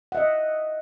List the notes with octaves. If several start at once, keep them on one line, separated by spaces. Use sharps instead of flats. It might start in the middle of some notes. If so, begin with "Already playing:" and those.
D#5 E5 F#5